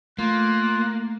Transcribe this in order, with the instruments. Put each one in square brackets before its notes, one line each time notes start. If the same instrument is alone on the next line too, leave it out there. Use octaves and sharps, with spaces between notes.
[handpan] A3 [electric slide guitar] A#3 [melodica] F4 [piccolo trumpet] F#6